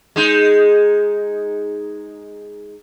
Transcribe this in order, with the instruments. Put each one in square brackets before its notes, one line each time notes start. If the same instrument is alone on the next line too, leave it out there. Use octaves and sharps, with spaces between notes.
[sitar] G#3 D#4